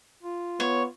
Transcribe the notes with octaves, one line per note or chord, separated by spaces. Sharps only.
F4
B3 C#5